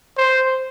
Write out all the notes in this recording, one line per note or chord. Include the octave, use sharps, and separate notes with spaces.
C5